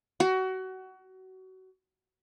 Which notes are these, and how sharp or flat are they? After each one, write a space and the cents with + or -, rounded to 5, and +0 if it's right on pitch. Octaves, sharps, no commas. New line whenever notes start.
F#4 +25